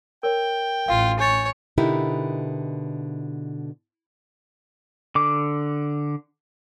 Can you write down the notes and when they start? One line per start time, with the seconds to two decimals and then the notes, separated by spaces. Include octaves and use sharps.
0.23 A#4 C#5 G5
0.88 A1 F4 F5
1.19 C#5 G#5 G6 A6
1.78 B2 D3 D#4 E4 G4 A#4
5.15 D3 D6